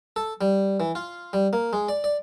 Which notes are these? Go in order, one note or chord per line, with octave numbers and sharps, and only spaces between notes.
A4
G3
E3
F4
G3
A#3
G#3
D5
D5